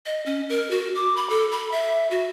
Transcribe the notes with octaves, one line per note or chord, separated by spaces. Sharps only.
D#5
C#4
A#4
F#4
D6
B5
A4
B5
E5
F#4